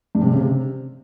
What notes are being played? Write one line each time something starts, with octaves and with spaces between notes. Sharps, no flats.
G2
C3
G2
C#3
C3